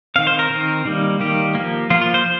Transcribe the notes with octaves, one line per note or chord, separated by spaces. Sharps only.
D#3 C4 F5
C5
A#4
D#3 C4
D#3 G3 A#3
D#3 G3 A#3 G4
F3 A#3
F3 A#3 F4
F4
C5